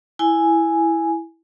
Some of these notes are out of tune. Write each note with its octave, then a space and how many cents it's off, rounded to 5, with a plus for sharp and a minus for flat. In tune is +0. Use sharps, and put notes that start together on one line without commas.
E4 +0 G#5 +0